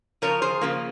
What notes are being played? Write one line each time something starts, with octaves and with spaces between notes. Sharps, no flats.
C#3 F3 A#4 C#5
G#4 C5
C#3 F3 A#3